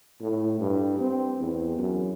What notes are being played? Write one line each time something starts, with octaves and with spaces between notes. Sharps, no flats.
A2
G2
C4
E2
F#2